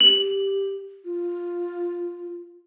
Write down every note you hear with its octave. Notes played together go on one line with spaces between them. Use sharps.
G4 F#7
F4